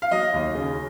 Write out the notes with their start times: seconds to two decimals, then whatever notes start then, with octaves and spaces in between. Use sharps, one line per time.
0.02 F5
0.11 F#3 D#5
0.33 D#2
0.55 C#3